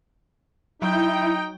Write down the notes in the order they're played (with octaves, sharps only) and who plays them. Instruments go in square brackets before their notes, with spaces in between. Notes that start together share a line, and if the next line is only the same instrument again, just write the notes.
[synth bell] F#3 [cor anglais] D#4 [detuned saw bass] E4 [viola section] G5